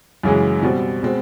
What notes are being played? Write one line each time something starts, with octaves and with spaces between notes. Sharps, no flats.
F#2 C#3 E3 G#3
B2 G3 C4
B2 G#3 C4